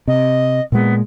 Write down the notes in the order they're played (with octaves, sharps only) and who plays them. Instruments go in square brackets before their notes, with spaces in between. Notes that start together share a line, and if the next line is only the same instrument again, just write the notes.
[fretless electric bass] C3 [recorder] D#5
[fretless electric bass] A#2 G#3 [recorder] B3